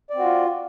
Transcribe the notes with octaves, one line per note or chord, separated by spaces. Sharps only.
C4 F4 F#4 D5